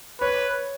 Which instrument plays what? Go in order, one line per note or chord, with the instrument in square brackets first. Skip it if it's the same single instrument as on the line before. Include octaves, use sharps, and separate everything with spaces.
[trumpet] B4 [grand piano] C#5